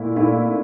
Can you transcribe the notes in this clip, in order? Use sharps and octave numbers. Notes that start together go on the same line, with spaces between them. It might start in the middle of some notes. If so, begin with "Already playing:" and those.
Already playing: A#2 A3 E4
A#2 A3 E4